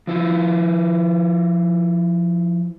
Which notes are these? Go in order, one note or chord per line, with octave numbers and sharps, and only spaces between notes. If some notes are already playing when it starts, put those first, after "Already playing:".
F3 E4 F4